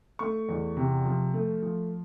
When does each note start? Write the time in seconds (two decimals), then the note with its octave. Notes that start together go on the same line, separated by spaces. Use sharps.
0.19 A3 C#6
0.49 E2
0.77 C3
1.05 F3
1.34 A3
1.62 F3